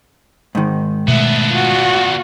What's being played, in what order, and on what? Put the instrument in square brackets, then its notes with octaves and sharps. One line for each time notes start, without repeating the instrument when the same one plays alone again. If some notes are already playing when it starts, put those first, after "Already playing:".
[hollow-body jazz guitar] G#2 D#3
[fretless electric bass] B2 A3 [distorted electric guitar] B3 D4 [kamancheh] E5
[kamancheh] F4 F#4